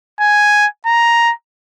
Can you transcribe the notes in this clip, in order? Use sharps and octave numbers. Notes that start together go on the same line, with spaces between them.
G#5
A#5